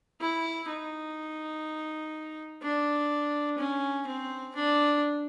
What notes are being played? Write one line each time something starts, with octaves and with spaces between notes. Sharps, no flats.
E4
D#4
D4
C#4
C4
D4